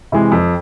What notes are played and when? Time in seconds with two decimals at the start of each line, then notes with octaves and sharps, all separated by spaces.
0.12 C3 E3 G#3
0.32 F2